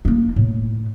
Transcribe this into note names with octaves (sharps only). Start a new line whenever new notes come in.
A#3 D#4
A2